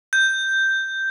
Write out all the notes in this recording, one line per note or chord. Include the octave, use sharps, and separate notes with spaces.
G6